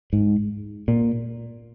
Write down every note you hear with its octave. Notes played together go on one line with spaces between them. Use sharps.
G#2
A#2